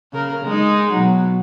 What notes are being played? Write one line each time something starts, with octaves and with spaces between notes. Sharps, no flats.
C#3 A#4
G#3 D#4
B2 F#3